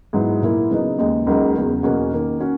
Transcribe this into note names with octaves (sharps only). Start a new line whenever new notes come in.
G#2 F#3 B3 E4
A#2 A#3 E4
C#3 F#3 B3 D#4
D#2 C#3 G#3 D#4
C#2 C#3 F#3 A#3 D#4
E2 C#3 F#3
E2 B2 A#3 C#4 F#4
D#3 A#3 C#4
C#4 F#4